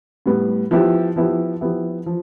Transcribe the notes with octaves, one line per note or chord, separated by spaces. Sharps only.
A2 G3 B3
F3 B3 E4 G4
F3 B3 E4 G4
F3 B3 E4 G4
F3